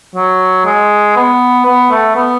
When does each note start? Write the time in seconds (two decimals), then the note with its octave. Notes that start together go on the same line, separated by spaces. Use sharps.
0.15 F#3
0.66 G#3
1.16 B3
1.66 B3
1.91 A3
2.16 B3